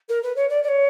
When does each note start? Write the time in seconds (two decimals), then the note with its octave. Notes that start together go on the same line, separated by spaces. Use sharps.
0.08 A#4
0.22 B4
0.36 C#5
0.49 D5
0.63 D5
0.68 C#5